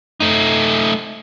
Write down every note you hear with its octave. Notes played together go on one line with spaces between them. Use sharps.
A3 D#4